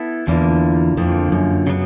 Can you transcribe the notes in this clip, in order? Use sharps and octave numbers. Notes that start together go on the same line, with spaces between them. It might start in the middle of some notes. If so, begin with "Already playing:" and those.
Already playing: B3 E4 A4
E2 D3 F3 A#3
F2 D3 F3 A#3
F#2
C#3 F#3 B3